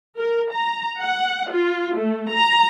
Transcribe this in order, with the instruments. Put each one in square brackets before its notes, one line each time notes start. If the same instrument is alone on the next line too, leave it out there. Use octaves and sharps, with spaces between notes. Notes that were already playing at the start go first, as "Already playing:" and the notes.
[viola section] A#4
A#5
F#5
F4
A3
A#5